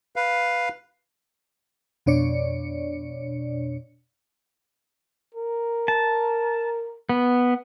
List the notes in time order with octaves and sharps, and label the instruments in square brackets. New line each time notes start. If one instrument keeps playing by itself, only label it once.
[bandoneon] B4 F5
[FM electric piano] F2 B2 D4 C#5 D5 C#7
[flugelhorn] A#4
[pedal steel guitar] A5
B3